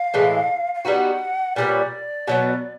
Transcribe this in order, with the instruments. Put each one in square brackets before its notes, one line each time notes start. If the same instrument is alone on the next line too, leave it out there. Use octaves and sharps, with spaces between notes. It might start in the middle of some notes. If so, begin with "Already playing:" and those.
Already playing: [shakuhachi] F5
[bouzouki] A2 E3 G#3
[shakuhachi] F5
[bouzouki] G3 B3 D#4 F#4 [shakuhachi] F#5
[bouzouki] A#2 G3 B3 [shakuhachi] D5
[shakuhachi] C#5
D5
[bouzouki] B2 F#3 B3